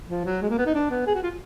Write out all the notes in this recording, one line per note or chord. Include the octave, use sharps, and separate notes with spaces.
F3
F#3
G#3
A#3
B3
D#4
D4
B3
G#4
F#4
F4